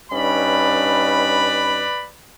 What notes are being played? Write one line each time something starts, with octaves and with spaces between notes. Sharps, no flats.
G2 C#4 D#4 B4 D5 B5